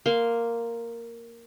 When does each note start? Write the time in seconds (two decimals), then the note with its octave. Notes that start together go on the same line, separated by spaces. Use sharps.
0.06 A#3 C6